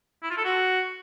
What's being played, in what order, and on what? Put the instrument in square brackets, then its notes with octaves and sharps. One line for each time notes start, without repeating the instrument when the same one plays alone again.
[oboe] E4
F4
A4
F#4